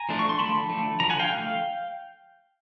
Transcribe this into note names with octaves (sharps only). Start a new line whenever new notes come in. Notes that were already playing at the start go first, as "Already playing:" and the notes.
Already playing: G#5 A#5
F3 A3 D4
C#6
C6
D3 F3 A3 A5 B5
D3 F3 A3
D3 F3 A#5
F#5 G#5
F5 G5
D3 F3 A3